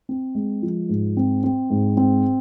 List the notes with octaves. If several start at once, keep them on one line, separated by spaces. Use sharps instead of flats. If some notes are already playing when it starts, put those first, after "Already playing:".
C4
G#3
F3
G#2
C4
C4
G#2
C4